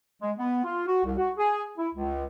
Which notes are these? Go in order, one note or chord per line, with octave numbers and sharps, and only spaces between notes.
G#3
B3
F4
F#4
C2
F#4
G#4
E4
C#2